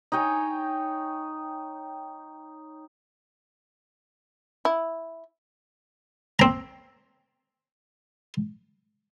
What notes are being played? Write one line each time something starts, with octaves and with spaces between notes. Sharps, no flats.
D#4 C#5 G5 G#5
E4
C4 A#5